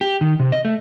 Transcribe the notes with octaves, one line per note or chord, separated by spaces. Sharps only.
G4
D#3
C3
D#5
A3